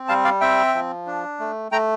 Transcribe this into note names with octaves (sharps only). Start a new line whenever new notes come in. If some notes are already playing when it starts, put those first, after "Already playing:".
Already playing: C4
G3 F5 A5
D5 F5
C4 E5 G5
F3
D4
A3
A3 G5 A#5